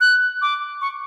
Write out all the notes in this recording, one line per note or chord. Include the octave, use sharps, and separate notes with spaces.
F#6
D6
C#6